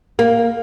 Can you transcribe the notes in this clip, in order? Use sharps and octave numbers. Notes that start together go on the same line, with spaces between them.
A#3